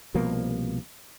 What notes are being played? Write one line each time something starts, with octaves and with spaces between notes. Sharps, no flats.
C2 B2 F3 A#3